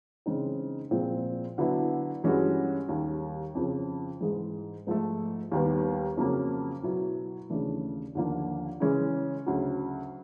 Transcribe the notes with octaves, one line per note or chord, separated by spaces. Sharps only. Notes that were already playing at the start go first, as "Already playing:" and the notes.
C#3 E3 G#3 C4 D#4
A#2 F3 G#3 C4
D3 F#3 B3 E4
G2 E3 G#3 C#4 F#4
D#2 D#3 G3
F2 C#3 F3
G#2 E3 G#3
G#2 F3 A3
D#2 D#3 G3 B3
F2 C#3 F#3 A#3
B2 F#3 B3 E4
D#2 C#3 E3 A3 D4
D#2 D3 F3 A#3
C#3 E3 G#3 C#4
D2 C#3 F#3